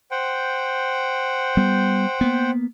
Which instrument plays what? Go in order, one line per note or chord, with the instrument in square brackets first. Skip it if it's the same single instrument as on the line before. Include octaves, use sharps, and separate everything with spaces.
[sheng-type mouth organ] C5 F#5 G5
[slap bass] G3 B3
A#3 B3